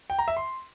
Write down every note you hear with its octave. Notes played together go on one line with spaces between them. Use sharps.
G5
A#5
E5
C6